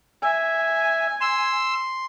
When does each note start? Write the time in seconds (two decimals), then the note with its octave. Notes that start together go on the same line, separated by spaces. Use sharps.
0.23 E5 G#5
1.21 C6 E6